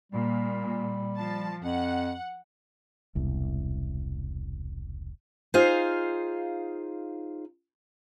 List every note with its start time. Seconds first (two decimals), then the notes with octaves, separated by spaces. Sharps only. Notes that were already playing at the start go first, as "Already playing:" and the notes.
0.12 A#2 G3
1.16 F3 A5
1.63 F2 F#5
3.15 E1 C2
5.54 D#4 F4 G#4 C5 F5